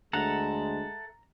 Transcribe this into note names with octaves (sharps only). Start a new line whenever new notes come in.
D2 G#3 A4 E5 F#5 A#5